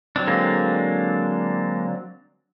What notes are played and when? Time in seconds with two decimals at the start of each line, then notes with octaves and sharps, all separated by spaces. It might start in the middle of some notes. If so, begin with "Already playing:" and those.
0.16 F#3 C4 D4
0.27 D3 G#3 A#3